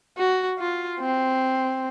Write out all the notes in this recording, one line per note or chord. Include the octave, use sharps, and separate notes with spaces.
F#4
F4
C4